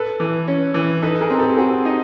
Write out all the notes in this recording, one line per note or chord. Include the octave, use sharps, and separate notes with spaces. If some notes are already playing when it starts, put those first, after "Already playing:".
Already playing: A4 B4
E3
C#4
E3
D#4 A4 B4
G#4 A#4
C4
G4 A4
C4 F#4 G#4
D#4